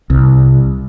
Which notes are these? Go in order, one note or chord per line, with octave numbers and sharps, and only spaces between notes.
C2